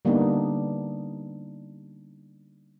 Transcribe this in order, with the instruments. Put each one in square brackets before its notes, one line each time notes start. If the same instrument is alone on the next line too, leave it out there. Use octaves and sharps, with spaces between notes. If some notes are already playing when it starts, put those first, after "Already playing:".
[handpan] D3 G3 A#3 B3 D4 D#4